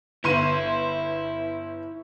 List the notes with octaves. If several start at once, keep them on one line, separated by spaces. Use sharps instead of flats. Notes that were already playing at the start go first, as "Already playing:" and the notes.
G1 E4 E5 C6 D#7